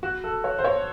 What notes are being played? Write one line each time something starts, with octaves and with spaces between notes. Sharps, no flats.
F#4
A4
C#5
C5
C#5